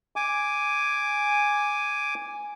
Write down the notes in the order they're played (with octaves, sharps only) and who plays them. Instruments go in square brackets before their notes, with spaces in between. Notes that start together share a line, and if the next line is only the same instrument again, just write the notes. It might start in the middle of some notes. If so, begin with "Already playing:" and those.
[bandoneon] G#5 D6